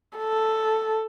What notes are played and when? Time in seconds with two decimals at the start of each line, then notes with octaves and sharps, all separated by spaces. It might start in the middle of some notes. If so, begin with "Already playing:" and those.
0.17 A4